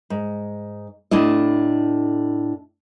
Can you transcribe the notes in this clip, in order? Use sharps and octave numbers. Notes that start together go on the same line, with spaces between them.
G#2
A2 D4 E4 D#5